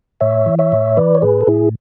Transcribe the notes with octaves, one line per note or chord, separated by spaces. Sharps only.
A2 C#5 E5
E3
C#5 E5
A2
E3 B4 D5
C#5
A2 G#4 B4
A4
A2 E4 G#4